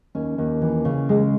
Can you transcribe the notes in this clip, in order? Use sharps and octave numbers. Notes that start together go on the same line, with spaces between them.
D#2 C#4
D#2
E3
C#3
G#3